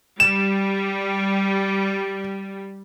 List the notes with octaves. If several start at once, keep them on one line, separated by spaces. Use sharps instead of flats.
G3 E7